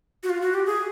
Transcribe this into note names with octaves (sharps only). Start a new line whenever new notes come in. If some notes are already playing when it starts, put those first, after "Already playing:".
F#4
F4
F#4
G4
G#4